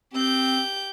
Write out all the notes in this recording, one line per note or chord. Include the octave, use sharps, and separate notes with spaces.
C4 G4 G6